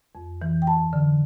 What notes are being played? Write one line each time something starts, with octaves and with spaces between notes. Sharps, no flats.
F2
E3
G5
G2 A5
D3